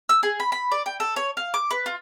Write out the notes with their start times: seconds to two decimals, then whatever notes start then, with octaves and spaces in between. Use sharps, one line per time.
0.09 E6
0.23 G#4
0.40 B5
0.52 B5
0.72 D5
0.86 G5
1.00 A4
1.16 C#5
1.37 F5
1.54 D6
1.71 B4
1.86 F4